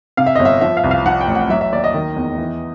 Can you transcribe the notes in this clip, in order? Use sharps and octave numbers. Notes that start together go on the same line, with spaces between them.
C3 F5
E5
G1 D#5
E5
F3 E5
F5
C2
F5
F3 F#5
G5
A1
F#5
F#3 E5
E5
D#2 D5
D#5
D#3
E2
E3